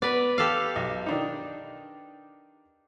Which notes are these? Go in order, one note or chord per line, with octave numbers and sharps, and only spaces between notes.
B3 B4 D5
G4 A4 F5
B1
D#3 D4 D#4